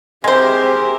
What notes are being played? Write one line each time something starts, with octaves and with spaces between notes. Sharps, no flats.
G#3 C4 G4 G#4 A#4 C5 E5 C6